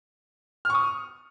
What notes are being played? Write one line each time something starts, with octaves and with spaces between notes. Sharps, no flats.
C#6 D#6 F6